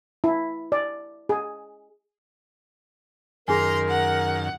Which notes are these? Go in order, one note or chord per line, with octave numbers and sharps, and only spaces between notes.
E4
D5
G#4
F#2 D#3 G#4 A#4 G#5 A#5 C6
F#5